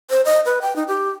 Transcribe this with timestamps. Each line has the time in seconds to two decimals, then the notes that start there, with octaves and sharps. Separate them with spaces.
0.10 C5
0.25 D#5
0.46 B4
0.62 G5
0.76 D#4
0.88 G4